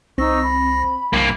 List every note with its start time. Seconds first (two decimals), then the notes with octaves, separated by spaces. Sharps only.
0.18 C2 C4 D#4 C#6 E6 A#6
0.42 B5
1.13 C2 G2 A#3